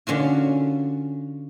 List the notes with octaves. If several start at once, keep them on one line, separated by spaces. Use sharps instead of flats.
D3 C#4 F4 F#4